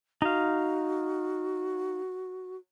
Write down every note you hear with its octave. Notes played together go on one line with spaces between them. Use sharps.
D#4 F#4 F5